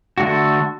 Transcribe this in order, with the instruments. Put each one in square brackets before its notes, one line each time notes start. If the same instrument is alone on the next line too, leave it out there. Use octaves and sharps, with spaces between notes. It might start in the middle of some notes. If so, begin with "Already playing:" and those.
[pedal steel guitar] D3 A3 D4 F#4